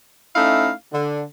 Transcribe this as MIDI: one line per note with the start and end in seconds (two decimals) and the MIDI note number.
0.36 0.71 57
0.36 0.71 61
0.36 0.71 63
0.36 0.71 64
0.36 0.71 77
0.93 1.23 50